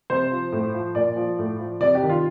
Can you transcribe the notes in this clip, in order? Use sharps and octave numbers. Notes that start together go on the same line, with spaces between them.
C3 C5
F3
A2
F3
A#2 D5
F3
A2
F3
C3 D5
G4
D#3
F4